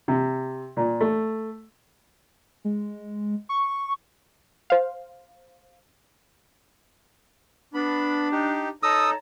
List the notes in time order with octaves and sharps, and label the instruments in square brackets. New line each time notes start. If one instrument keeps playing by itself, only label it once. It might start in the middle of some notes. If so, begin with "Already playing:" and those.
[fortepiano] C3
A#2
A3
[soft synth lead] G#3
C#6
[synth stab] C5 F5
[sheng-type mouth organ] B3 B5 [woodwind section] D4
[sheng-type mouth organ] D#4 G4
[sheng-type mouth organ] D#4 A4 [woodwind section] C#5 A5 A#5 [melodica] D#6 E6